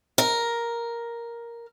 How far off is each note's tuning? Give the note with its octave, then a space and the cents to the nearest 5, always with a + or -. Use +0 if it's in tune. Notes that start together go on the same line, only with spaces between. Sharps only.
A#4 +5